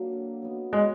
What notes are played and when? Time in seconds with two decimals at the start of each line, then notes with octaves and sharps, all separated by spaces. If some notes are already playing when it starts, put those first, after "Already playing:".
Already playing: F#3 A#3 D4
0.13 D3
0.42 F#3 B3 D#4
0.72 F#3 G#3